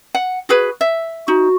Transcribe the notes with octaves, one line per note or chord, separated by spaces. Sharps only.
F#5
F#4 G#4 B4
E5
D#4 F#4